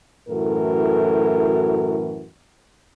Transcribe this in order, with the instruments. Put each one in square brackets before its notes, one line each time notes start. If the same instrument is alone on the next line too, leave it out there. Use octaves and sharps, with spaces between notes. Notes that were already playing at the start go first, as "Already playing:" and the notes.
[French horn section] F#2 A2 E3 F#4 A4 A#4